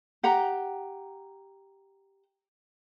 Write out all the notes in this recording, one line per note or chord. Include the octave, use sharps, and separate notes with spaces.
G4 F#5 G5 A#5